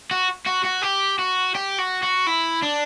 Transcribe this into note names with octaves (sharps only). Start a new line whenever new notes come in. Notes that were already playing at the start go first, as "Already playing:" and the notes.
F#4
F#4
F#4
G4
F#4
G4
F#4
F#4
E4
D4